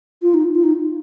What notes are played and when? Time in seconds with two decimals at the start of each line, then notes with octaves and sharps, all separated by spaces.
0.22 F4
0.34 D#4
0.55 F4
0.63 D#4